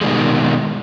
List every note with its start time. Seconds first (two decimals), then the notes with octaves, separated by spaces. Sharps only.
0.01 B2 D#3 G3 G#3